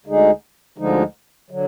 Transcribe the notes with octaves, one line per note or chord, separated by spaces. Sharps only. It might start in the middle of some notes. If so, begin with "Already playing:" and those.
D2 D3 G#3 D#4 G#4
D2 D3 F3 G#3 D#4
D3 F#3